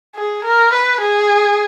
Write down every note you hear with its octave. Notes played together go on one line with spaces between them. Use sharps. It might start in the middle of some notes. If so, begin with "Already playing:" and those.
G#4
A#4
B4
G#4